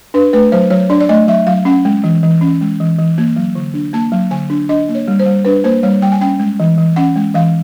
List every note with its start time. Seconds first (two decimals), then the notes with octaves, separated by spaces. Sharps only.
0.14 D4 B4
0.33 A3 B4
0.52 F#3 C5
0.70 F#3 C#5
0.90 D4 D5
1.00 D5
1.09 A3 D#5
1.27 F#3 E5
1.47 F#3 F5
1.65 C#4 F#5
1.85 G#3
2.04 E3
2.23 E3
2.41 C#4
2.61 G#3
2.80 E3
2.99 E3
3.18 A#3
3.36 F#3
3.55 D3
3.74 D4
3.93 A#3 A5
4.12 F#3
4.31 D3 G#5
4.50 D4
4.69 D4 D#5
4.89 A#3
4.95 C#5
5.08 G3
5.20 C5
5.26 G3
5.45 D4 B4
5.64 A#3 C5
5.83 G3 C#5
6.02 G3 G5
6.12 G#5
6.21 C#4 G5
6.39 G#3
6.60 E3
6.78 E3
6.96 C#4 F#5
7.16 G#3
7.34 E3 F5